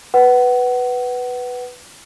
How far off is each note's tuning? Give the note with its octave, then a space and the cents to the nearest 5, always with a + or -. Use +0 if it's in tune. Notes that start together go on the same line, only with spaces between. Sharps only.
B4 +0 F#5 +20